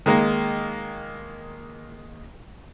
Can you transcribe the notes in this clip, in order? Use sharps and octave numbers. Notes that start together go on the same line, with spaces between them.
D#3 G#3 A#3